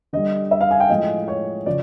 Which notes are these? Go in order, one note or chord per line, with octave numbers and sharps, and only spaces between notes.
D3 G3 D#5
E5
F5
G#5
G5
A2 F3 G#3 D#5
C#5
C#3 F3 D5